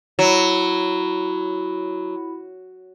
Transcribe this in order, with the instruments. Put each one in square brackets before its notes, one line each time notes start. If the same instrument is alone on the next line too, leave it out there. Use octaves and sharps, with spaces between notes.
[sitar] F#3 [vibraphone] E4 B5